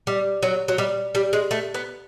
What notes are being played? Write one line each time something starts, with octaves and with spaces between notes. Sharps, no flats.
G3
F#3
F#3
G3
G3
G#3
A3
B3